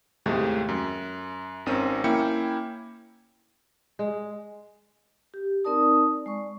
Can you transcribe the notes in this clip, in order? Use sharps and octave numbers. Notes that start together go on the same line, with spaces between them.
D#2 A2 C3 G#3 A3
F#2
G#1 D#3 C4 C#4 D#7
A#3 C#4 E4 G5 C#7
G#3
G4
C4 D#4 A#4 D5 A5 D#6
G#3 D5 C#6